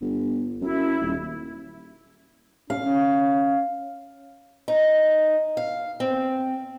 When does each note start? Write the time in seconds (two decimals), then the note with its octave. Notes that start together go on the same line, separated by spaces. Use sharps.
0.01 G1
0.61 F#2 E4
1.01 D#1
2.70 C#4 F5
4.68 D#4
5.57 F5
6.00 C4